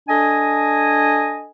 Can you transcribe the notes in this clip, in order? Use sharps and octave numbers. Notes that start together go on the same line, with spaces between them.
D4 A4 D#5 G#5